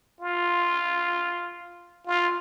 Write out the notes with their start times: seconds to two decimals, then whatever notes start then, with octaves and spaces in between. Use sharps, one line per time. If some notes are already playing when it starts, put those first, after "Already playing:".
0.21 F4
2.07 F4